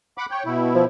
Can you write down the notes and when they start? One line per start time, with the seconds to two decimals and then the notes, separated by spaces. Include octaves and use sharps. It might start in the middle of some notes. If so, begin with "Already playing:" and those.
0.18 F#5 B5 D6
0.31 C#5 G5
0.45 B2 E4
0.75 F3